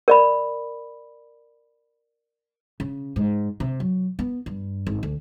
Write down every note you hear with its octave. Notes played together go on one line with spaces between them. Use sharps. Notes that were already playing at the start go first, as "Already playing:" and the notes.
A#4 D5 B5
C#3
G#2
C3
F#3
B3
G2
G#1
D2